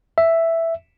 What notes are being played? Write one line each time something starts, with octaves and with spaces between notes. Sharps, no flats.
E5